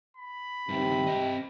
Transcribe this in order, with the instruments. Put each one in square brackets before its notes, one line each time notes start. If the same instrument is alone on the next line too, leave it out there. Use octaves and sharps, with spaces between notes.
[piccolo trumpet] B5
[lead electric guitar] G2 D#3 [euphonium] C3
[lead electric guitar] C4 D#5